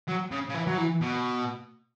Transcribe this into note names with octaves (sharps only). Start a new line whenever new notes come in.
F#3
C#3
C#3
E3
F#3
E3
B2